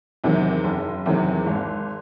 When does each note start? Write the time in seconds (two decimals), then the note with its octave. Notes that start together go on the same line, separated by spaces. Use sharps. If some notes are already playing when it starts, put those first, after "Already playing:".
0.24 E2 C3 D#3 F#3
0.64 F#1
1.06 E2 C3 D#3 F#3
1.46 G#1